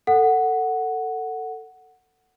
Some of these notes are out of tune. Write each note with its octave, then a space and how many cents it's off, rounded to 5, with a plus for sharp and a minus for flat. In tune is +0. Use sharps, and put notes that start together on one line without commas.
A4 +20 F#5 +0